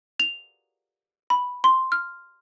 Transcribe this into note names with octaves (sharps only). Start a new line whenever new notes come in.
F7
B5
C6
F6